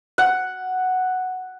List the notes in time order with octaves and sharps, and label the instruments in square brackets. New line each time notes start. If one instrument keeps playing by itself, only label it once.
[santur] F#5